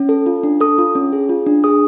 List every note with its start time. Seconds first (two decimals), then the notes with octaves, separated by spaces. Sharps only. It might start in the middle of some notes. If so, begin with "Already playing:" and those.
Already playing: C#4
0.09 A4
0.26 F4
0.43 D4
0.61 A4 D#6
0.78 F4
0.95 C#4
1.13 G#4
1.29 F4
1.46 D4
1.64 G#4 D#6